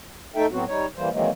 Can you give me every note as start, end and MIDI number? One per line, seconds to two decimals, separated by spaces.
0.36 0.46 57
0.36 0.46 63
0.36 0.46 69
0.36 0.46 76
0.36 0.46 79
0.51 0.65 45
0.51 0.65 54
0.51 0.65 59
0.51 0.65 60
0.51 0.65 66
0.68 0.86 55
0.68 0.86 63
0.68 0.86 73
0.96 1.09 52
0.96 1.09 55
0.96 1.09 58
0.96 1.09 72
1.11 1.30 51
1.11 1.30 52
1.11 1.30 54
1.11 1.30 56
1.11 1.30 58
1.11 1.30 60